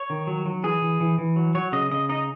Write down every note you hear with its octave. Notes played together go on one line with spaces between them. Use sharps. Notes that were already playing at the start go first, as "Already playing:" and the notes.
Already playing: C#5
D#3
F#3
F#3
E3 G#4
E3
E3
E3
F#3
F#3 C#5
C#3 D#5
C#3 D#5
D#4 D#5